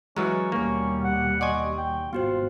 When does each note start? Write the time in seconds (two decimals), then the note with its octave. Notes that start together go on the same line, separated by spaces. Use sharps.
0.17 E3 F#3 G#3 C#4 A#5 F6 A6
0.52 D#2 B2 G3 A#3 C#4
1.04 F#5
1.41 D5 D#5 F#5 G#5 C6 C#6
1.78 G5
2.13 G#1 B3 F4 F#4 C5